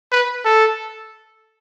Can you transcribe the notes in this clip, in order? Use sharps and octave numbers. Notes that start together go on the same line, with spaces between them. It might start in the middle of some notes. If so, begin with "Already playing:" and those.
B4
A4